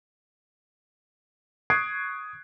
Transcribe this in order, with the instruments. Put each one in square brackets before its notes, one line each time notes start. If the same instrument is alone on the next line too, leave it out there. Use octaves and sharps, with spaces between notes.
[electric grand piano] C#6 D#6 F#6 G#6 C7 D7